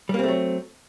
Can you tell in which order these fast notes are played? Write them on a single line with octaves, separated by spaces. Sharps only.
G3 A#3 C4 A3 F#3